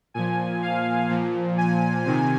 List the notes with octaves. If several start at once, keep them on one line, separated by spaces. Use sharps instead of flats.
A#2 F3 G#5
F5
A#2 F3
G#5
C3 D#3 G#5